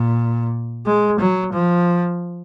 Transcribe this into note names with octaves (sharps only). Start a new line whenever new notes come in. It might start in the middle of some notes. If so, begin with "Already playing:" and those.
Already playing: A#2
G#3
F#3
F3